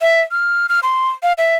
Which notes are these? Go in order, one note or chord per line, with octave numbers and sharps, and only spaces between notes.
E5
F6
F6
C6
F5
E5